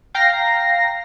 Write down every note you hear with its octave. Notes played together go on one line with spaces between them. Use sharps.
F5 G5 A#5 A#6 C7